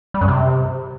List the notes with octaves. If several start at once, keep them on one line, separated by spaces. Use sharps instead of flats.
G3
F#2
C3